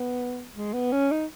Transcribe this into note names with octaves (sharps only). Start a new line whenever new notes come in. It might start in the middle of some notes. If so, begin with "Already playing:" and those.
Already playing: B3
G#3
B3
C#4
D#4